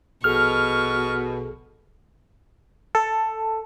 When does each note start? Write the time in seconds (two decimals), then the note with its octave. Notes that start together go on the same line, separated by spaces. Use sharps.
0.24 A#1 B2 G#4 A4 C#6 F6
2.95 A4